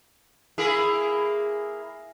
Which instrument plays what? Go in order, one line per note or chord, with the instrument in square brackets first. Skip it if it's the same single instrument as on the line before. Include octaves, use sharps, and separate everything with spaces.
[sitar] A#3 E4 G#4